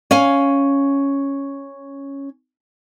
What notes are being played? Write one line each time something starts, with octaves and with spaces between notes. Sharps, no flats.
C#4 F5 G#5